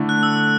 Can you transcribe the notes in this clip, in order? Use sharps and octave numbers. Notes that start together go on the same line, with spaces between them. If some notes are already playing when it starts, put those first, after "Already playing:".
Already playing: D3 A3 E4
F#6
E6